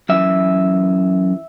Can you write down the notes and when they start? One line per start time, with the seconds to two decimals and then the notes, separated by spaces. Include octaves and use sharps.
0.09 F#2 E3 E5